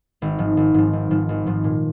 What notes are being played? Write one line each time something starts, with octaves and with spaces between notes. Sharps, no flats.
G#1
G#2 F3
G#1
G#2 F3
G#1
G#2 F3
G#1
G#2 F3
A#2